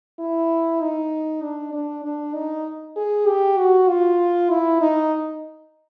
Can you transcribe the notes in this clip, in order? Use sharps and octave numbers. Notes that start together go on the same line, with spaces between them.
E4
D#4
D4
D4
D4
D#4
G#4
G4
F#4
F4
E4
D#4